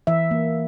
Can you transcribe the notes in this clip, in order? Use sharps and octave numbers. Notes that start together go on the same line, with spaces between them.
E3 E5
A#3